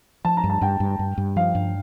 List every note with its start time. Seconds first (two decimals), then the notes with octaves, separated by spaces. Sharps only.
0.25 F3 A5
0.37 A#5
0.44 G2
0.50 A5
0.61 G2 G5
0.80 G2
0.99 G2
1.18 G2
1.36 F3 F5
1.55 G2